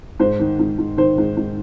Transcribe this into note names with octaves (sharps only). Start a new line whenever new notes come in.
G#2 C5
D#3
G#2
G#2
D#3 C5
G#2
G#2